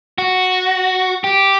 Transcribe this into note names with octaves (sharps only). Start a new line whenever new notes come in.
F#4
G4